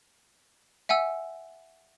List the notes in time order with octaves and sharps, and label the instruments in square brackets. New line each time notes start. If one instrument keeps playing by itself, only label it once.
[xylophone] E5 F#5 G#5 E6